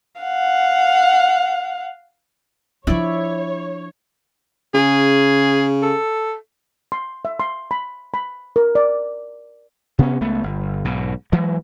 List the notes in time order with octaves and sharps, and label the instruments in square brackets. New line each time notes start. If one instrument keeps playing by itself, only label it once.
[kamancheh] F5 F#5
[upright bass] F3 D4 [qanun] E4 D5 [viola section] C#5
[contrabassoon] C#3 [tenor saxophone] G#4
[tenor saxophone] A4
[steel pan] C6
E5
C6
B5
B5
A#4
D5
[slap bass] C3 B3 C#4
C#2 A3 B3
G1
B1 G#2 B2
E3 F#3 G#3